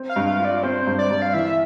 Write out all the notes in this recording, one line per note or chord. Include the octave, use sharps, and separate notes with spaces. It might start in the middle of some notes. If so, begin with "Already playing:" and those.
Already playing: C4
F5
G2
F5
F4
D5
C4 C5
G2
D5
G2
F5
E3 E5